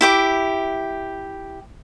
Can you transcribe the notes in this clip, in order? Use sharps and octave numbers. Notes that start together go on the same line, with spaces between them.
E4 G4 D6